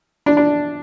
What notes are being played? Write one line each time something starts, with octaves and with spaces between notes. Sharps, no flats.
D4
D4